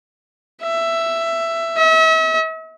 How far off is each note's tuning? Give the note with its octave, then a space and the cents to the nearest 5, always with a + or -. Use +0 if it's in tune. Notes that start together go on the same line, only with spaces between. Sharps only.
E5 +10
E5 -40